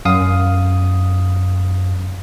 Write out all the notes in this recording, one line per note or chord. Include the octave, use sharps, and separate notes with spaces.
F#2 F5 D#6